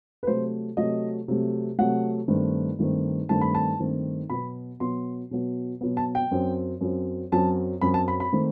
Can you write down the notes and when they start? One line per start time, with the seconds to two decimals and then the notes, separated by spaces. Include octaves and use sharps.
0.23 B4
0.27 C3 F#3 A3 C5
0.77 C3 F#3 A3 D#5
1.28 C3 F#3 A3
1.79 C3 F#3 A3 F#5
2.28 G2 D#3 A3 C4
2.79 G2 D#3 A3 C4
3.29 G2 D#3 A3 C4 A5
3.41 B5
3.55 A5
3.79 G2 D#3 A3 C4
4.30 B2 F#3 B3 B5
4.80 B2 F#3 B3 C6
5.31 B2 F#3 B3
5.81 B2 F#3 B3
5.97 A5
6.15 G5
6.31 F#2 F#3 C4
6.81 F#2 F#3 C4
7.32 F#2 F#3 C4 A5
7.81 F#2 F#3 C4 B5
7.94 A5
8.08 B5
8.20 B5
8.33 D#3 A3 C4